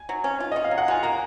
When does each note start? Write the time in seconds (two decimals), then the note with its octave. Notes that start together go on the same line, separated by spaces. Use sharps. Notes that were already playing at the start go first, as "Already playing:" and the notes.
Already playing: G#5
0.09 F#3
0.24 C#4
0.40 F4
0.52 C#4 D#5
0.64 F5
0.71 F#3
0.78 F#5
0.88 F4 G#5
1.03 A#3 A#5